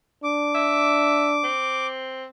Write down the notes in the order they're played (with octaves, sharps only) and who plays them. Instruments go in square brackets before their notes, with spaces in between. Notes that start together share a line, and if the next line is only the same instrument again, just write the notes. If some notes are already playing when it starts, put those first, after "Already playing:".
[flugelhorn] D4 [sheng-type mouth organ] D6
[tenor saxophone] E5
C4